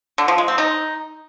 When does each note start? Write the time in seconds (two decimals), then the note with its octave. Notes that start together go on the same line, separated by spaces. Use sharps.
0.18 D3
0.28 F3
0.38 G#3
0.48 C4
0.58 D#4